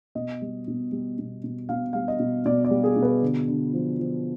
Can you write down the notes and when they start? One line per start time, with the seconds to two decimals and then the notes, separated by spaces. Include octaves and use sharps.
0.15 B2 D#5
0.42 G3
0.68 B2
0.92 G3
1.18 B2
1.44 B2
1.69 B2 F5
1.93 G3 F5
2.08 D#5
2.20 B2
2.45 B2 D5
2.65 D5
2.71 G3
2.84 G#4
2.96 B2
3.02 B4
3.22 D3
3.48 D3
3.74 F3
3.99 F3